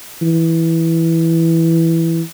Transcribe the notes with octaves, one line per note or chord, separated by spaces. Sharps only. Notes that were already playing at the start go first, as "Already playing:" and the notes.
E3